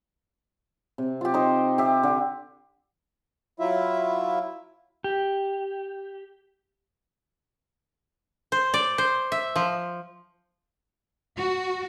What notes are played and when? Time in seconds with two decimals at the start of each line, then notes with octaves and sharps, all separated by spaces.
0.98 C3
1.21 F4 G4
1.34 D#4 C5
1.78 G4 E5
2.03 D3
3.60 F#3 E4 F4 E5
5.04 G4
8.52 C5
8.74 D5
8.98 C5
9.32 E5
9.56 F3
11.37 F#4